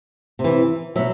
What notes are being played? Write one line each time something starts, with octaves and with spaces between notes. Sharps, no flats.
C3
E3
B2 F#3 E5